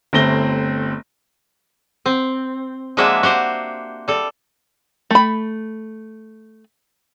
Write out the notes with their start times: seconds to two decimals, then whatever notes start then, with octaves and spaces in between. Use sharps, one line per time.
0.13 G1 A3 C4 A#6 G7
2.06 C4
2.97 F3 G#3 A#3 D4 F#4 E5
3.23 F#4 G4 C5
4.08 G3 A4
5.10 A3 B5